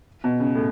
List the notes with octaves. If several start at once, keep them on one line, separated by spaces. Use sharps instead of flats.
B2
C#3
A2